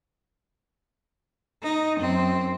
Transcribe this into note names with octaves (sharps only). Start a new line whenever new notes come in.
D#4
F#2 C4